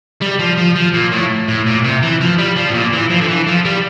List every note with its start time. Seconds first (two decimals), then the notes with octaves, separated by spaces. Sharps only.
0.21 G3
0.39 F3
0.57 F3
0.75 F3
0.94 A#2
1.12 A2
1.48 A2
1.66 A#2
1.84 C3
2.03 E3
2.21 F3
2.38 G3
2.56 F3
2.69 A2
2.74 A#2
2.93 E3
3.10 F3
3.21 D3
3.28 E3
3.47 F3
3.65 G3